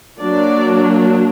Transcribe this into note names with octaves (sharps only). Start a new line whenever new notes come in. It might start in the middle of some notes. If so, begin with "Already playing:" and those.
F#3 A#3 D4 D5